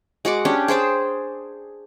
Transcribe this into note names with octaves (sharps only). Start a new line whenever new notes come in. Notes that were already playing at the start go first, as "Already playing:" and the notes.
G#3 F#4 F#5 D6
C#4 D4 G4
G#4 C5 G5 A5